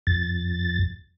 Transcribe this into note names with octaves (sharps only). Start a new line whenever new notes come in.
F2 A6